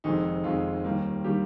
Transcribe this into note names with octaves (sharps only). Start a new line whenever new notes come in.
F1 F2 D#3 G#3 D#4
F1 F2 D#3 G#3 F4
D#2 D#3 G3 A#3
D#3 G3 A#3 G4